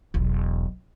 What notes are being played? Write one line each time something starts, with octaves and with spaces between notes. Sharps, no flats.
E1 B1